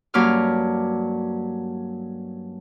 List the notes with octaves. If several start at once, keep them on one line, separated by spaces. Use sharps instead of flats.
G2 F#3 A#3 C#4 D5 F6